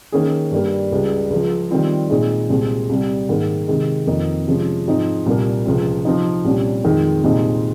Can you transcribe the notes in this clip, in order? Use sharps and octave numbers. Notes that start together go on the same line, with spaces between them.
D#3 A#3 C#4 G#4
G2 G3 A#3
C#2 C#3 G3
C#2 C#3 F3
D#3 G3 C4 F4
A#2 G#3 C4 D#4 G#4
C2 A#2 G#3 C4
C2 C3 G3
G#2 D#3 A#3
C3 D#3 G#3
F2 D#3 A#3 D#4
C3 F3 G#3 C#4
G#2 F3 C4 D#4
C2 A#2 G3 A#3
C#2 C3 F3 C4
C3 F3 C4 D#4
C2 A#2 G3 C#4
F2 D#3 G#3 C4 D#4
C2 A#2 G#3 C4 D#4